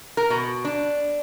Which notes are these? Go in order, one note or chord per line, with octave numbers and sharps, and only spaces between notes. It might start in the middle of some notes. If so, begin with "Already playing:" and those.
A#4
B2
D4